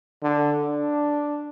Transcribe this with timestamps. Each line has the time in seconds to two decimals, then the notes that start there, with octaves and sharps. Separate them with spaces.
0.23 D3
0.66 D4